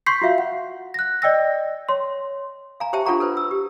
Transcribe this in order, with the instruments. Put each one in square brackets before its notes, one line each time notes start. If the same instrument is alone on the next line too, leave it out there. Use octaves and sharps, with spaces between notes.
[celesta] C6 C#6 G6 B6 C7
F4 F#4 E5 F5
F#5
F#6 A#6
D5 D#5 G5 E6 A#6
C#5 C6
[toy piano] F5 G#5 A#5
G4 C5 E5 G5 A5
D4 F4 A4 F#5 A#5 C#6
A4 B4 C5
E6
G4